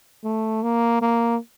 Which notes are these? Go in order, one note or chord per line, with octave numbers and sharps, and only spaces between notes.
A3
A#3
A#3